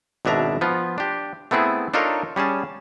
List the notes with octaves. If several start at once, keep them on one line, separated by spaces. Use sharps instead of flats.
G#1 B2 D4 E5 A#5
F3 B3 F4
D4 G4
A3 B3 C4 E4 G#4
D4 D#4 F4 A4 A#4 C#5
G3 C#4 G#4 A5